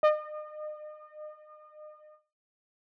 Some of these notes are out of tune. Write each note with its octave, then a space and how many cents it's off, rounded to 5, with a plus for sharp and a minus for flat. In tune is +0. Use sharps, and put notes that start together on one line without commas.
D#5 -40